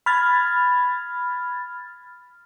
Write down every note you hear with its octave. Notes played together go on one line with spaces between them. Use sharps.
B5 F6 G#6 A6